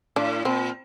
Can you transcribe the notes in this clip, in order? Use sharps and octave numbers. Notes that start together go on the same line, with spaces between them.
A2 D4
A#2 C4